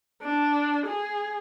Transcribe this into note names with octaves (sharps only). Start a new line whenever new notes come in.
D4
G#4